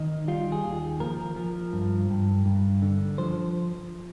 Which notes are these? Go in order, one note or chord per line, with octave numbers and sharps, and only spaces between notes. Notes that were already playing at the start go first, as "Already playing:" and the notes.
Already playing: D#3 D#4
G3 F4
G#4
D#2
F3 A#4
F3
G2
G2
G2
D3
F3 C5